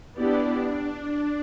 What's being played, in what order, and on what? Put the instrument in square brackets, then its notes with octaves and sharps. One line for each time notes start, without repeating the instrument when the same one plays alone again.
[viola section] B3 E4 G4 D5 [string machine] D4